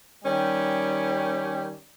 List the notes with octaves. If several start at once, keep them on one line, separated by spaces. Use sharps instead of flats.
D#3 G3 C#4 G4